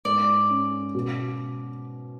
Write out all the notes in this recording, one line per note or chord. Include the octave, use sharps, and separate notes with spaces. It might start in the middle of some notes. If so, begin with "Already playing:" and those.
G#2 D5
C#4
B2